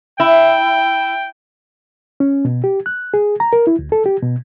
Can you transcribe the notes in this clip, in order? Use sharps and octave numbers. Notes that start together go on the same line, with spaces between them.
E4 G5
C#4
B2
G4
F#6
G#4
A#5
A#4
E4
D2
A4
G4
B2